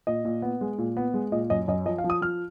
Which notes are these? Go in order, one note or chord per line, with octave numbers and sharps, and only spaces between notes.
A#2 D#5
A#2
B3
G#3
A#2
B3
G#3
A#2 D#5
F#2 D#5
F#2 D#5
F3 D#5
F5
F3
D#6
F3 F6